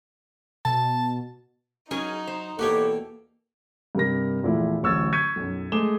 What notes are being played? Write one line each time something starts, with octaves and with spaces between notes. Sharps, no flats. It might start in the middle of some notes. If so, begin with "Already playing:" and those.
B2 A5
F#3 C#4 D#4 G#4 A#4
C5
E2 B2 A#3 F#4 G4 A4 C#5 G5
G2 C3 A#4 A#6
E2 A#2 F3 A3 E4
D1 A1 C#6 E6 G#6 A6
C#6 G6 G#6 B6 C#7 D#7
B1 F#2
G#3 A3 G#4 D6 E7 G7